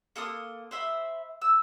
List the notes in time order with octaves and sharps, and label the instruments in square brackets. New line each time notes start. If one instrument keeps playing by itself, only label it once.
[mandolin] A#3 A4 C6 D#6
C5 E5 B5
E6